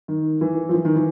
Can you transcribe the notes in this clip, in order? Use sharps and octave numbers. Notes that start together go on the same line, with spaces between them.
D#3
E3
F3
E3
D#3
E3